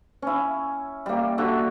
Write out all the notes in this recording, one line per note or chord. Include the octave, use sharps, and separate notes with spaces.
C#4 E4
G3 A#3
D3 F#4 E5